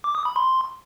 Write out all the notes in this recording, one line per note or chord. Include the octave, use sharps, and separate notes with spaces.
D6
D#6
B5
C6